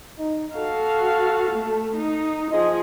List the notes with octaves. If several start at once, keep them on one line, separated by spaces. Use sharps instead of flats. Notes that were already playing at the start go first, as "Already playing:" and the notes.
D#4
F#4 A4 F5
A3
D#4
F3 G#4 D#5